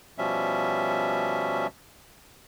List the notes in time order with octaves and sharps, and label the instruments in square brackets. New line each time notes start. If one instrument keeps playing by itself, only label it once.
[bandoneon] B2 F3 G3 C#4 E5